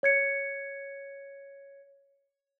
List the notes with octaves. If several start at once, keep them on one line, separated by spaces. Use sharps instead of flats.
C#5 G#6 C#7